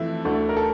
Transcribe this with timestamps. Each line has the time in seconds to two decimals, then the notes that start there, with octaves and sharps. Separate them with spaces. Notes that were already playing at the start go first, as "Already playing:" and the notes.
Already playing: F2 E3 A3 E4
0.25 D2 D3 A3
0.49 A#4
0.57 A4